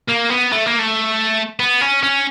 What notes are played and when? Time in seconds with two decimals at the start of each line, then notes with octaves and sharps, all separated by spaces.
0.09 A#3
0.30 B3
0.52 A3
0.66 A#3
0.79 A3
1.59 B3
1.81 C#4
2.03 C#4